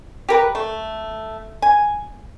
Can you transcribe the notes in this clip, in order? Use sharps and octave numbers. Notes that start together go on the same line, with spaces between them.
G4 A#4 B4
A3
G#5